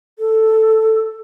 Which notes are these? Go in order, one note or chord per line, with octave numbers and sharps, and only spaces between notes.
A4